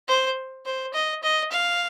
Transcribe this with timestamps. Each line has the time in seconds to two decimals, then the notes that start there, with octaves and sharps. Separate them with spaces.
0.08 C5
0.66 C5
0.94 D#5
1.23 D#5
1.52 F5